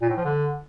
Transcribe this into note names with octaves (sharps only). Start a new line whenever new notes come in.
A#2
A2
F3
D3